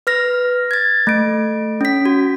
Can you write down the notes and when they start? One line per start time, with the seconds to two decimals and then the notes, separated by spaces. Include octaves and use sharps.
0.07 B4 F6 A#6
0.71 G#6 A6
1.07 A3 D7
1.81 C#4 B6
2.05 F#4